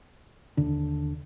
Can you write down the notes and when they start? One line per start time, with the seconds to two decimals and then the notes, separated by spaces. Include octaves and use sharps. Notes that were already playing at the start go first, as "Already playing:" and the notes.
0.57 D#2 D3 D4